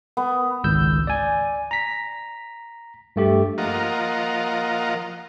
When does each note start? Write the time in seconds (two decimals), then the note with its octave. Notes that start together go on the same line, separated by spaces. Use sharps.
0.17 B3
0.64 G#1 C#2 E6 G6
1.07 D5 G#5
1.71 A#5 B6
3.16 G2 A3 G4
3.58 F3 A#3 F4 D#5 F#5 A#5